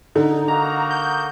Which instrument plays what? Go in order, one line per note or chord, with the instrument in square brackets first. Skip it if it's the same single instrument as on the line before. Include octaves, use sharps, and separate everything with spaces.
[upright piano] D3 [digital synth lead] D#4
[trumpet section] A#3 D#4 F#4 [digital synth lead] A#5
[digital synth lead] G6